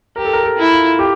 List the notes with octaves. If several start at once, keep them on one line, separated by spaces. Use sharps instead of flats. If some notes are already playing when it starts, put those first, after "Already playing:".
G4 A#4
A4
A#4
A4
E4
F4
G4